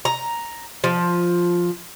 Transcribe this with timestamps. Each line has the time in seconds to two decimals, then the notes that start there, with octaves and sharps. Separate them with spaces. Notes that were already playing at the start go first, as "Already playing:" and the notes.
0.05 A#5
0.84 F3